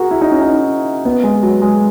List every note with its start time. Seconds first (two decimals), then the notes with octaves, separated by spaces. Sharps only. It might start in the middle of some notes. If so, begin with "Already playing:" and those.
Already playing: F#4 G#4 A#4
0.11 E4
0.21 D#4
0.31 C#4
0.42 D#4
1.05 B3
1.24 G#3
1.43 F#3
1.62 G#3